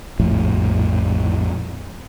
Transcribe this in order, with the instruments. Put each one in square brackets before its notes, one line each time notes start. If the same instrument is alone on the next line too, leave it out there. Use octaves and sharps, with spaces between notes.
[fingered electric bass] A#1 F2 A2